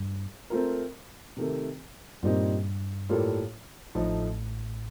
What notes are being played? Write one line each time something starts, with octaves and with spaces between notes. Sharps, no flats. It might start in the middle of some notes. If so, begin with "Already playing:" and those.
Already playing: G2
A3 C4 F4 A#4
C3 D#3 A3
G2 A#2 G3 C4 D#4
A2 G3 A#3 F4 A4
A1 A2 F3 A3 D#4 A4